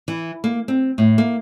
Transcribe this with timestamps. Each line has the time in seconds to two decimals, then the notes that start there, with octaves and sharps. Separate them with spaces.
0.08 E3
0.44 A#3
0.68 C4
0.98 A2
1.18 A#3